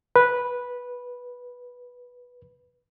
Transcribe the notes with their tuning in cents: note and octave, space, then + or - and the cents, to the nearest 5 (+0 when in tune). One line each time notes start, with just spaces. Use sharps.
B4 -10